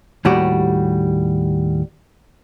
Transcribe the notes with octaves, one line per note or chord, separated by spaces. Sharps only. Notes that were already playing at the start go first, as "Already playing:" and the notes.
D#2 A2 G3 F#4 D5